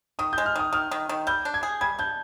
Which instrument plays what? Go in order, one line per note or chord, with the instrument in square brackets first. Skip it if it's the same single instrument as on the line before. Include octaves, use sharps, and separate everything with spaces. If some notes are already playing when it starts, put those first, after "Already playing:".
[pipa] D#3 [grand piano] D#6
[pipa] G#3 [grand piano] G6
[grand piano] F6
[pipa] D#3 [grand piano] D#6
[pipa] D#3 [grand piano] F6
[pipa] D#3
D#3
[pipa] G3 [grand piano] G6
[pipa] D4
[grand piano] G#6
[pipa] G#4
[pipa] G3 [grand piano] G#6
[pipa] D4 [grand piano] G6